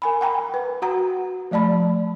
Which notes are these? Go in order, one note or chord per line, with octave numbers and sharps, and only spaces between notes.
A#4 G#5 B5
F#5 G5 A#5 B5
B4
F#4 F#5 A#5
F3 A3 D5 A5 B5